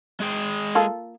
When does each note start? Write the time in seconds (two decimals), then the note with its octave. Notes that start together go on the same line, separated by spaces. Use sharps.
0.20 G#3 G#4 G5
0.75 A#3 F4 A4